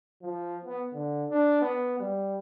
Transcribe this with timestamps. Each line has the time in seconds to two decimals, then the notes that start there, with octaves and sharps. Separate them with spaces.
0.22 F3
0.65 B3
0.93 D3
1.30 D4
1.61 B3
2.00 G3